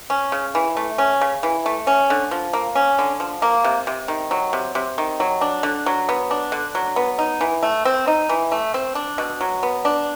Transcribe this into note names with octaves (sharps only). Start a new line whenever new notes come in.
C#4
C#3
E3
A3
C#4
C#3
E3
A3
C#4
D3
F3
A#3
C#4
D3
F3
A#3
C3
C3
D#3
F#3
C3
C3
D#3
F#3
D4
D3
F#3
B3
D4
D3
F#3
B3
D#4
E3
A3
C4
D#4
E3
A3
C4
D4
B2
F#3
B3
D4